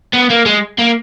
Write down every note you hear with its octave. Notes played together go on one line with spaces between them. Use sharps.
B3
A#3
G#3
A#3